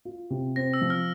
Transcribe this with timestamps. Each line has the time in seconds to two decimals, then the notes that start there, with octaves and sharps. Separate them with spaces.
0.05 F4
0.30 C3
0.56 C4 A#6
0.74 E6
0.81 F3
0.90 F6